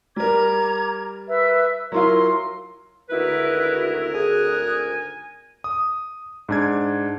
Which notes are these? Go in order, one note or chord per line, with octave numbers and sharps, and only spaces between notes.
G3 A#4 A#5 D6 G#6
B4 E5 E6
F#3 E4 F4 A#4 C6
G#1 D2 D#4 E4 F#4 A#4 B4
G#4 G#5 D#6 F#6
D#6
G#2 D4 G#6